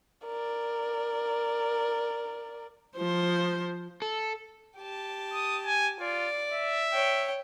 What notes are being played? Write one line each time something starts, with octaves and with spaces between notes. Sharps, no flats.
A#4 D5
F3 C5
A4
G4 A5
D#6
G#5
F4 D5
E5
C#5 G5